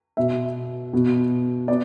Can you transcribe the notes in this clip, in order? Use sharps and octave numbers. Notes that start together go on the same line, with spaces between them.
B2 B3 E5
B2 B3
B3 D5